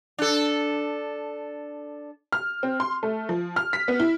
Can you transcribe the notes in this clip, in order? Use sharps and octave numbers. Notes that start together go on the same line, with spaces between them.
D4 A4
F6
C4
C6
A3
F3
F6
B6
B3
E4